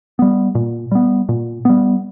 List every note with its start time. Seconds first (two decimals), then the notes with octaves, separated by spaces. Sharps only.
0.19 G3 B3
0.55 A#2
0.91 G3 B3
1.29 A#2
1.65 G3 B3